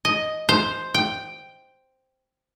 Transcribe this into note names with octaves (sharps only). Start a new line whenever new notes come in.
D#5
C5
G5